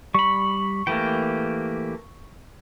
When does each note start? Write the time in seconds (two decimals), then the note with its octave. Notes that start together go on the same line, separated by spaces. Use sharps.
0.14 G3 B5 C#6
0.87 E3 A3 A#3 G4 G5